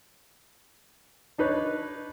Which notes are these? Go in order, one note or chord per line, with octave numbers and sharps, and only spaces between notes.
D4 D#4 B4 C#5